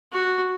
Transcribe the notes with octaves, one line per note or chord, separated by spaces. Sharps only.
F#4